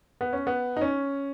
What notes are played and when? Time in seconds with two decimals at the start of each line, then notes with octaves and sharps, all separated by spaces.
0.21 B3
0.33 C#4
0.47 B3
0.77 D#4
0.81 C#4